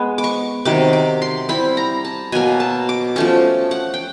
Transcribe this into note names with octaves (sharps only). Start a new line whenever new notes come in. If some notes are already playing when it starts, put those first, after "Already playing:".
Already playing: G#3 B3
D6
C#6
C3 D#3 F#3 D6
D6
C6
G3 C4 E4 B5
A#5
A5
B2 F#3 A#3 G#5
A5
D6
F3 A3 C#4 C#6
F#5
G5